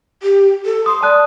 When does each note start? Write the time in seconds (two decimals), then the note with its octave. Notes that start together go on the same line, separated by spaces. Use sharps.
0.23 G4
0.65 A4
0.86 C6 D#6
1.03 D5 A5 D#6 F#6